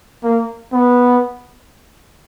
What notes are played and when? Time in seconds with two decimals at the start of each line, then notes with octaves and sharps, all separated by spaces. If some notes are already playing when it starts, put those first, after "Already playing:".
0.24 A#3
0.73 B3